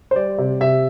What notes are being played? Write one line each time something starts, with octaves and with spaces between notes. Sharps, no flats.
C5
G3 D5
C3
C3 E5